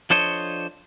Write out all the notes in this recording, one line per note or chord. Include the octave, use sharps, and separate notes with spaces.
F3 D4 A4 C5 C#5 D#5